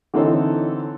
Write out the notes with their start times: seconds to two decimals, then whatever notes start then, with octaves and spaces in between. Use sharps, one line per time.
0.14 D3 E3 C4 D#4 A4 C#5